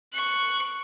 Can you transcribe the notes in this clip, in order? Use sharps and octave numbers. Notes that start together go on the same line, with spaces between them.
C#6 F#6